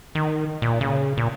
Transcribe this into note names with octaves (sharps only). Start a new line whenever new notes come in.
D#3
A#2
C#3
A#2